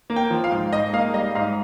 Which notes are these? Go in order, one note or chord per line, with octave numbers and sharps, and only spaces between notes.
A#3
G5
F3
F5
G#2
G#2 D#5
A#3 F5
G3 D#5
G#2 F5